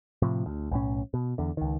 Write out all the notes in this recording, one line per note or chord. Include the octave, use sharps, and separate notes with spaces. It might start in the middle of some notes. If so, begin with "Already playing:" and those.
A2 C3 F3
D2
B1 A2 C#4
B2
E2 D3
C#2 D#3